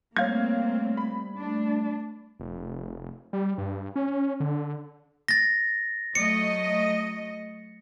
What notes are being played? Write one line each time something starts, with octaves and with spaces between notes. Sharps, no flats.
G3 A3 A#3 C4 C#5 F5 G#6
B5
A3 D4
F1
G3
G2
C#4
D3
A6 A#6
F#3 A3 D#5 C#7